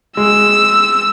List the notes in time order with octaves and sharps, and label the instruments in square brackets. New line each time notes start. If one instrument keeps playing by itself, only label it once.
[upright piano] G#3 [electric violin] E6